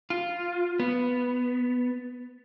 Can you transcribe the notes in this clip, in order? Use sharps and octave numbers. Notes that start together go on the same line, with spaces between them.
F4
B3